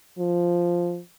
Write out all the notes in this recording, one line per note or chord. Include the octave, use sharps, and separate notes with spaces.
F3